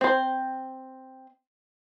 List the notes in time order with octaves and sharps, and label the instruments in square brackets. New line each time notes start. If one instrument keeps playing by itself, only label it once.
[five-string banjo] C4 C5